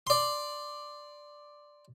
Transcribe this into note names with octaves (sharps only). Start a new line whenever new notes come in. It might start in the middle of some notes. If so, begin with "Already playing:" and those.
D5 C6